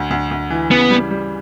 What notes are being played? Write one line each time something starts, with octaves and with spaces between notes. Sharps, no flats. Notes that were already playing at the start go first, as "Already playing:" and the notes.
Already playing: D2
D2
D2
E3
C#3 B3
G3
G3